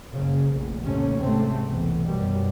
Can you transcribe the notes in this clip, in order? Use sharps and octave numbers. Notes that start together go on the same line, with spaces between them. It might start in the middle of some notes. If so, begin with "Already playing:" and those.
F#1 C#3
F1 A#1
D#2 G#2 C3 A3 C#4
G#1 G#2 C3 A3 C4
B1 E2
F#2 B2 D#3 G3